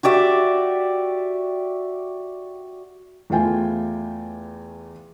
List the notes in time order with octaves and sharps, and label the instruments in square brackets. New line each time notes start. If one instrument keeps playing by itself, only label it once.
[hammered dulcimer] F#4 G4 D5 E5
[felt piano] E2 E3 A3 F4 G5 G#5